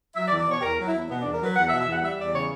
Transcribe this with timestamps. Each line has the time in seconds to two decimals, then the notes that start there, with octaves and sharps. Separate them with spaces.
0.16 F#3 E5
0.28 D5
0.31 E2
0.39 D5
0.47 B2 C#5
0.59 G4
0.62 E2 A#4
0.78 F#3
0.86 E4
0.94 E2
1.09 B2 B3
1.21 D4
1.25 E2
1.32 A#4
1.40 F#3 B4
1.56 E2 F#5
1.68 E5
1.72 B2
1.79 E5
1.86 E2
1.91 F#5
2.02 G3 E5
2.18 E2 D5
2.33 C#3 C#5